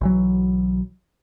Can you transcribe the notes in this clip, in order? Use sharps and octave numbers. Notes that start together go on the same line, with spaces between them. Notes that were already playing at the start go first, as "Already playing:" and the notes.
B1 E3 F#3